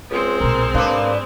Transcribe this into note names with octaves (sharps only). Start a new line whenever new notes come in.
C#2 G#3 C4
B1 A#2 A#4
G#2 A#3 D4 B4